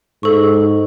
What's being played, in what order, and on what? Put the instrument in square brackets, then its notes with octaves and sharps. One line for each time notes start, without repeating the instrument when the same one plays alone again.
[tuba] G#2 [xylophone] A4 C#6